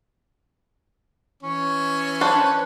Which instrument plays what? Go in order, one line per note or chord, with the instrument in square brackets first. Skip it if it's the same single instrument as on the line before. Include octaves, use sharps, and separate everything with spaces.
[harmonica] E3 C#4 C#5
[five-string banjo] D4 B4 C5